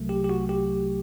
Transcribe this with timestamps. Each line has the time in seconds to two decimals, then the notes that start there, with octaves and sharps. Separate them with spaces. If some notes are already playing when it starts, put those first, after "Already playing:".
Already playing: C2 C3 F#3 A3
0.09 G4
0.24 G4
0.29 F#4
0.49 G4